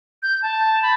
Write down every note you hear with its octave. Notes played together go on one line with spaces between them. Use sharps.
G6
A5
B5